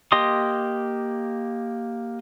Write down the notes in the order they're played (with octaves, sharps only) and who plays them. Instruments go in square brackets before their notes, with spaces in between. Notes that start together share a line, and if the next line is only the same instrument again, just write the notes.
[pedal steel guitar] A#3 G4 D#5 C6 D#6